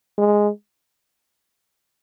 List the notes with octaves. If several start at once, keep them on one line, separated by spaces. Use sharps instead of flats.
G#3